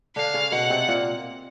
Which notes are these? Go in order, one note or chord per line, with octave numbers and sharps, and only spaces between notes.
D3 D4 F5
C#3 C#4
B2 B3 F#5
C3 C4
A#2 A#3